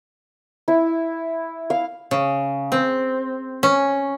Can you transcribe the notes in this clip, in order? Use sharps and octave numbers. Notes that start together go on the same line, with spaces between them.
E4
F5
C#3
C4
C#4